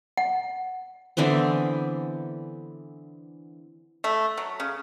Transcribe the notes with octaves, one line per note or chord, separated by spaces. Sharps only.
F#5
D3 E3 B3 C4
A3
F#3
C#3